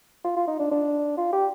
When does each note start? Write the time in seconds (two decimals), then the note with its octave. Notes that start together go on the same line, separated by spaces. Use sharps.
0.24 F4
0.36 F4
0.47 D#4
0.59 D4
0.71 D4
1.17 F4
1.33 G4